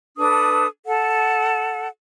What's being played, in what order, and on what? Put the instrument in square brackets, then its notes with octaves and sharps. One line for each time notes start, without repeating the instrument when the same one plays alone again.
[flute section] D4 A4 B4 D#6
A4 F#5